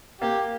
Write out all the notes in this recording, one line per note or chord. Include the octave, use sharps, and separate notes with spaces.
A#3 G4